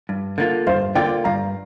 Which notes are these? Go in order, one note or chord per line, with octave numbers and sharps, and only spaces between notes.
G2
D3 A#3 F4
G2 C5 F5
D3 A#3 F4 D5 G5
G2 F5 A#5